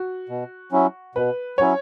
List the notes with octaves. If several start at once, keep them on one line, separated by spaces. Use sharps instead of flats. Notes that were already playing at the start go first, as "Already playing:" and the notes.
Already playing: F#4
B2
F#3 C#4 E4
B2 B4
F#3 C#4 E4 C#5